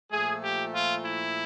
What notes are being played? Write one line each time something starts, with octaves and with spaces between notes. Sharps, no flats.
A#2 F3 A3 G#4
G4
F4
E4